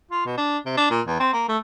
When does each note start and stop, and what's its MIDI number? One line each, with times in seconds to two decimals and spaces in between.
0.11 0.22 65
0.25 0.33 47
0.37 0.58 62
0.66 0.73 48
0.77 0.85 62
0.90 1.01 46
1.07 1.20 40
1.20 1.29 60
1.33 1.48 58
1.49 1.57 57